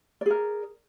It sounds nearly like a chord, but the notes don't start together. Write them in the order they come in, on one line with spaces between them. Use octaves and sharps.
D5 G#4 A#4